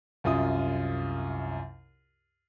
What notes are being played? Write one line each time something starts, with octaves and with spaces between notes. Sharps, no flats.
C2 F#2 F4 D#6